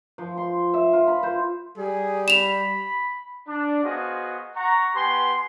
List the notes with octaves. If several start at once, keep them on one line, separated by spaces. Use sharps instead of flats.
F3
C6
E5
F4
B5
C5
G3 G#4
B5 E7 F7
D4
B3 F#4 G#4 C5 D#5 F5
F#5 A#5 C#6
B3 G4 B4 G#5 C6